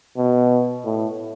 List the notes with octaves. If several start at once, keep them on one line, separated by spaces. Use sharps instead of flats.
B2
A2